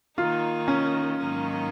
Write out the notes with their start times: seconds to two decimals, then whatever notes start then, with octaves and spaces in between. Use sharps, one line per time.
0.18 D#3 A#3 D#4 F4
0.68 C#4
1.18 G#2 D#3 F#3 A#3 D#4